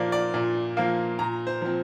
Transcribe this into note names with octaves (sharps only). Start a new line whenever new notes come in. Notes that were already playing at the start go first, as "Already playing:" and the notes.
Already playing: A#2 F3 A#3 D5
D5
A#2 D5
F3 A#3 F5
A#2 A#5
C5
F3 C4